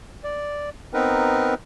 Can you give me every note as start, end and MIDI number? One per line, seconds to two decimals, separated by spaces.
0.24 0.70 74
0.94 1.54 59
0.94 1.54 60
0.94 1.54 63
0.94 1.54 70
0.94 1.54 71